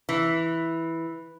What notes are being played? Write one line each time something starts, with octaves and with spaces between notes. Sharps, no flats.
E3